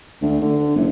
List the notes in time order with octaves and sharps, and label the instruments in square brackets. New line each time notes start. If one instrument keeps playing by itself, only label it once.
[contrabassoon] D2
D3
F#1